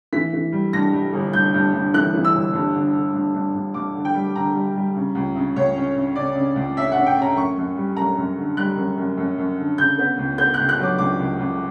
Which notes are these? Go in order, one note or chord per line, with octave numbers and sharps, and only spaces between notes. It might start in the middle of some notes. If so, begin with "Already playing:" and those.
E3 B6
E3
G3
G2 A#6
G3
G1
G2 G6
G2
G2
E3 F#6
E3
E6
G1
G2
D3
D3
G2
G2
G2
G2 D6
D3
G5
G3
D3 A#5
G3
G3
C#3
C#2
C#3
C#2 C#5
C#4
C#3
C#3 D5
C#3
C#2
C#4 E5
F#5
C#4
G5
C#4 A#5
F#2 C#6
F#2
G3
F#2 A#5
F#2
D3
G3 F#6
F#2
F#2
F#2
F#2
D3
C#3 G6
B3
C#2
B3 G6
F#6
C#2
F#6
F#3 D6
C#2 D6
C#2
C#2